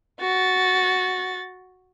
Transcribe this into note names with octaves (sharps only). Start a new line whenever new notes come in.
F#4 A6